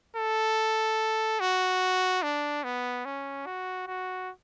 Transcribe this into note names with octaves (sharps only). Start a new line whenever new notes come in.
A4
F#4
D4
B3
C#4
F#4
F#4